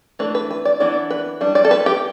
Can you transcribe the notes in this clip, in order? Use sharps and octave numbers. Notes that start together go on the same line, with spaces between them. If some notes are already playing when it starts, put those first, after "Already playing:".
E3 A3 D4 B4
B4
B4
D5
E3 B3 D4 D5
B4
G3 D4
D5
A4
B4
G4